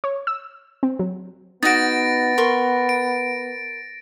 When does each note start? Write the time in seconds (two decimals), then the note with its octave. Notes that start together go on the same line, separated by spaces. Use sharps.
0.04 C#5
0.27 E6
0.83 C4
0.99 F#3
1.63 B3 D#4 F#4 A6 A#6 D7
2.38 A#4 C6 C#6
2.89 D7